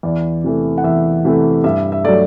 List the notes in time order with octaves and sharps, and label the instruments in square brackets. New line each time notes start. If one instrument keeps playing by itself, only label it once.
[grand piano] E2 D5
C3 E3 A3
F#5
E2 E5
C3 E3 A3
G2 E5
E5
F#3 A3 D5